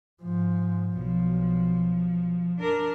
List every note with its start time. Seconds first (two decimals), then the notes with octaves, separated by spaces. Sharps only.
0.23 G#2 F3
0.97 B1 F3
2.60 D4 A#4